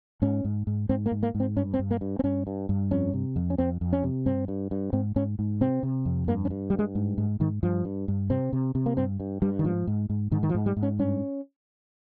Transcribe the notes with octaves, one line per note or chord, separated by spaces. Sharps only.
G#2 C#4
G#2
G#2
G#2 C4
A#3
G#2
A#3
G#2
C4
G2 C#4
C4
G2
A#3
G2
C4
G2 C#4
G2
G2
F2 C#4
C3
F2
C#4
F2 C4
F2
C#4
C3
G2 C4
G2
G2
G#2 C4
G#2 C#4
G#2
C3 C4
C3
F2
G2 A#3
C#4
G2
G2 G3
G#3
G#2
G#2
G#2 D#3
G2 F3
G2
G2
C3 C4
C3
C3
A#3
G2 C4
G2
G2 G3
D#3
G#2 F3
G#2
G#2
G#2 D#3
D#3
F3
G#2
G3
G#2
C#4
G2 C#4